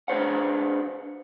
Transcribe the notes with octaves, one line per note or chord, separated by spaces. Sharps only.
D4 G#4 B4 C5 F5 F#5